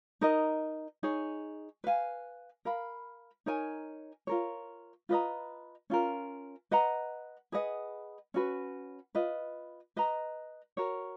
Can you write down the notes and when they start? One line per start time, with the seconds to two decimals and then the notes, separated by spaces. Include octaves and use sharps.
0.21 D#4 A#4 D#5
1.03 D#4 G#4 C#5
1.84 B4 F5 G#5
2.65 A#4 F5 B5
3.46 D#4 A#4 C#5 G#5
4.27 F4 A#4 C#5
5.09 F4 B4 D#5 A#5
5.90 C#4 F4 A#4
6.71 B4 D#5 F#5 A#5
7.52 G#4 B4 D#5 F#5
8.34 C#4 F#4 B4
9.15 F4 B4 D#5
9.96 B4 D#5 A#5
10.77 F#4 A#4 C#5